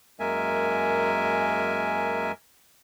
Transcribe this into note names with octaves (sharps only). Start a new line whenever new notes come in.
F#2 G#3 A#3 A#4 E5 G#5